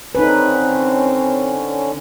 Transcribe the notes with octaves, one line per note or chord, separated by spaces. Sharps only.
D3 C4 C#4 D#4 B4